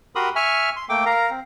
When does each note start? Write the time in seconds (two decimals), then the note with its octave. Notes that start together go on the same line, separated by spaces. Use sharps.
0.15 F#4 G4 A#4 B5 C6 D#6
0.36 E5 G#5 C#6 F6
0.76 C6
0.89 A3 A#3 G5 D6
1.06 A#4 F5 A#5
1.30 C4